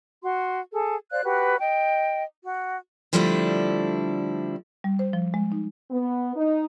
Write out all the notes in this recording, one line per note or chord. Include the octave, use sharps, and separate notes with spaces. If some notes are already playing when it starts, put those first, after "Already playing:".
F#4 C6
G#4 A4
C5 D5 F5 F#6
F#4 G4 B4
D#5 G5
F#4
D3 F3 G3 A3 D4 E4
G3
C5
F3
G#3
D#4
B3
D#4